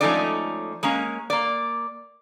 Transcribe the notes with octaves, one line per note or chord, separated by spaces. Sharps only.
F3 G#3 A3 C#4 D#4 D5
G#3 A#3 C#4
A#3 D5